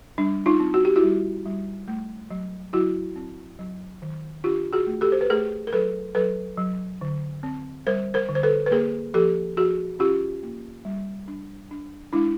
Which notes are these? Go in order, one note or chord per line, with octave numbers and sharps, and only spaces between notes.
G3 D4
D#4 F4
C4
F#4
G4
E4 F#4
G3
G3
A3
F#3
F#3 E4 F#4
C4
F#3
D#3
D4 F4 G4
F#4 G#4
A3
G4 A4
C5
B4
A3 G#4 A#4
A#4
F#3 A4 B4
F#3 A4 B4
F#3
D3
C4
G3 A#4 C5
A#4 C5
D3
C5
A4 B4
B4
A#3 G#4 A#4
F3 G4 A4
F3 F#4 G#4
C#4 F4 G4
A#3
G3
D4
D4
G#3 D4 E4